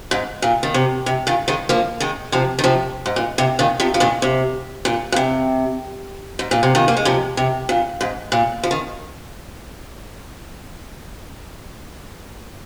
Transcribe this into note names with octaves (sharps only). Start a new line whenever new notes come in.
G#2
A#2
D#3
C3
C3
A#2 D#3
D#3 G#3
F3 A#3
D#3 G#3
C3 F3
D#3
C3 F3
G#2
A#2
C3
A#2 D#3
C3 F3
F3
A#2 D#3
C3
A#2
A#2
C3
G#2
A#2
C3
A#2 D#3
A#3
G#3
C3 F3
C3
A#2
G#2
A#2
F3
D#3